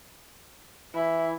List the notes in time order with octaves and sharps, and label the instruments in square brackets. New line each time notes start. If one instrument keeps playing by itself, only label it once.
[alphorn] E3 [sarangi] E4